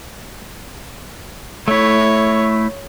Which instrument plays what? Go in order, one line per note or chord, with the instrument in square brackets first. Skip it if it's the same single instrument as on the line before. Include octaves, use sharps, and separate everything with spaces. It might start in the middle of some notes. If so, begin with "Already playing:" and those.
[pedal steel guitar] A3 E4 [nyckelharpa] C#5